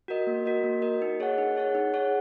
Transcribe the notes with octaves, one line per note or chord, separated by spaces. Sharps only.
F#4 A#4 D#5
A#3
F#4 A#4 D#5
A#3
F#4 A#4 D#5
D#4
G#4 C#5 F#5
D#4
G#4 C#5 F#5
D#4
G#4 C#5 F#5